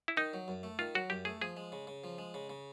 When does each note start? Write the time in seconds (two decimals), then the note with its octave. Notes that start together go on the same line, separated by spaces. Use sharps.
0.08 E4
0.17 D#3 D#4
0.33 F#3
0.48 F#2
0.63 A3
0.79 D#3 F4
0.95 F#3 F#4
1.10 F#2 G4
1.25 A3 G#4
1.41 F3 G#4
1.57 G#3
1.72 C#3
1.87 C#3
2.04 F3
2.18 G#3
2.34 C#3
2.50 C#3